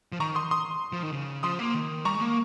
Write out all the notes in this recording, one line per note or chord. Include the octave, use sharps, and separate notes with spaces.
F3
D#3 A#5 C#6
C6 D#6
C6 D#6
F3
D#3
C#3
F3 C6 D#6
A#3
D#3
G3 A#5 C#6
G#3
A#3